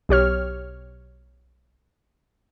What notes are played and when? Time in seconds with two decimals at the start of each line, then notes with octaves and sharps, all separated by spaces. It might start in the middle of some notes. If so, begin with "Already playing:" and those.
0.09 B1 G4 C#5 F6